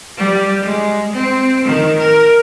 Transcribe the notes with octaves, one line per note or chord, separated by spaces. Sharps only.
G3
G#3
C4
D#3
A#4